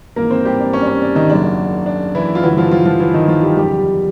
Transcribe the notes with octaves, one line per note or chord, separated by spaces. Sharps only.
G#1 G#2 E3 A#3 A#4
C4 C5
G3 G4
D4
C#4
D4
C#4
D4
D#3 D#4
F#1 F#2 C#3 F#3 A#3 D4
D4
E3 E4
F4
G2 D3 E3 F#3 E4
F3 F4
F3 F4
F3 F4
E3 E4
D#3 D#4
F3 F4
G3 G4
F#1 E2 C#3 G3 G4